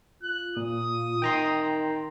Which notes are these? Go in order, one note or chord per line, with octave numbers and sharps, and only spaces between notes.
F4 F#6
A#2 D#6
D#3 G5 A#5 C6